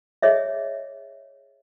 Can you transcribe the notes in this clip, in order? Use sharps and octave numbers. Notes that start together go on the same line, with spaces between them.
G#4 C#5 D#5 E5